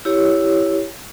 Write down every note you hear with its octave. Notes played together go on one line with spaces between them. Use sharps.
E4 G4 C#5